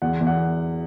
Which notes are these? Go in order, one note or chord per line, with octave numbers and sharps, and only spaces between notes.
E2 F#5
E2
F#5